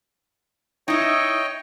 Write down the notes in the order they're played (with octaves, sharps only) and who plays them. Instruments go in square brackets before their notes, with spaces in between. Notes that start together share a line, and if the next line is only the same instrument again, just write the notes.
[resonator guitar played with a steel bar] D#4 E4 [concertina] C#5 D#5 G5